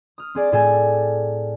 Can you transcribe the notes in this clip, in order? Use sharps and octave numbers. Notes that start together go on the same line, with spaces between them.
D#6 F6
C4 G#4 D5
A2 G#4 A4 G5 G#5 A6